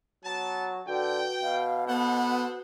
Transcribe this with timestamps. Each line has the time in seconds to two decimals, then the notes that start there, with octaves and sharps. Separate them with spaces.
0.24 F#3 B3 A5
0.88 D3 F#4 B4 G5
1.42 B2 F5
1.88 B3 A4 C5 F#5